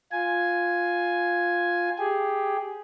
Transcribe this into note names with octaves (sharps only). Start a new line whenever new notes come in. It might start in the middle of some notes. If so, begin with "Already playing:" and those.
F4 G#5
G4 G#4